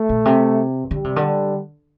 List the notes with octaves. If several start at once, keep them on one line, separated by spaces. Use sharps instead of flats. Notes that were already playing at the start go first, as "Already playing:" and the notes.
Already playing: A3
A#2
C3
D3 G3
C3
D3